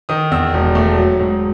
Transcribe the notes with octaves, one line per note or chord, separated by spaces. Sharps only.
D#3 D#6
E2 E6
E1
A3
F#3
G#2